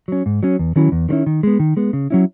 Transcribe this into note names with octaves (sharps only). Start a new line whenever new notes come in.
F#3 C#4
G#2
F#3 C#4
E2
D#3 F#3 C#4 E4
E2
D#3 F#3 C#4 E4
D#3
G#3 B3
D#3
G#3 B3
C#3
F#3 C#4 E4